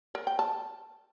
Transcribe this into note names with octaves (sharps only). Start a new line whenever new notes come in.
A#4
G5
A5